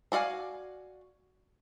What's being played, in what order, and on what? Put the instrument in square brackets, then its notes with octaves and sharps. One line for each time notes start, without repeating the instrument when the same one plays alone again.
[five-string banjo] D4 F#4 D5 F5 G#5